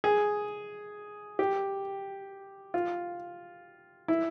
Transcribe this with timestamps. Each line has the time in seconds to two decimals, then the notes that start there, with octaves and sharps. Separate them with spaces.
0.04 G#4
1.39 G4
2.74 F4
4.08 E4